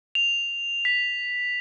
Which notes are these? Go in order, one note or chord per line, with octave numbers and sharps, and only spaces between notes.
F7
B6